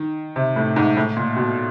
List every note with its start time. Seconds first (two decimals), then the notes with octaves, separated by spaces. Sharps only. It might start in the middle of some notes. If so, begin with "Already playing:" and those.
Already playing: D#3
0.36 C3
0.56 A2
0.76 G#2
0.97 A2
1.17 A#2
1.36 B2